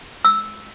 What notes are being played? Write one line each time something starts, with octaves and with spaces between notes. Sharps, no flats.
E6